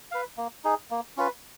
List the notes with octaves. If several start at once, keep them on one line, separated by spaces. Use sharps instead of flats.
B4 F5
A#3
D#4 G#4
A#3
C#4 F4 B4